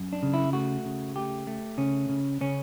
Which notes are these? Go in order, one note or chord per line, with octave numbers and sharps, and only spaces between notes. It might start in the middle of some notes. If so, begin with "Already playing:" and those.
Already playing: F#2
D4
C#3
E4
A3 F#4
C#3
A3 G4
A3
C#3 C#4
C#3
C#3 C#4